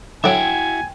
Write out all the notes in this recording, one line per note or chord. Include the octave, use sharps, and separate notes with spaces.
D3 F#3 E4 F#4 E5 G5 G#5 D7